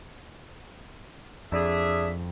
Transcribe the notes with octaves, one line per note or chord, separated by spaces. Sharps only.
F2 D4 G#4 E5